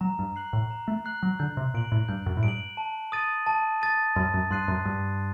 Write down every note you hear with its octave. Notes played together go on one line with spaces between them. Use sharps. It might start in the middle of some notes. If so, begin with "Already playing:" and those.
F#3 A#5
G2
F#6 C7 F#7
A2
A#5
A3
F#6 C7 F#7
F#3
D3 G6
C3
A#2 D7 F#7
A2
G2 G6
F#2
A2
G2 D7
F#7
A5
D#6 A6 D#7
A5
D#6 A6 D#7
F#2 A5
F#2
G2 C6 F#6 C7 D#7
F#2
G2 A5